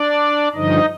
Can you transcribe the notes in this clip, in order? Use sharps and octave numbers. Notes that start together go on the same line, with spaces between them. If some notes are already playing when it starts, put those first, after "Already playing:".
Already playing: D4 D5
G2 D3 F3 D#4 D#5